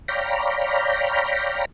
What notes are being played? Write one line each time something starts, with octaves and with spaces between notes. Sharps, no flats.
C#5 D5 F5 G5 A#5 B5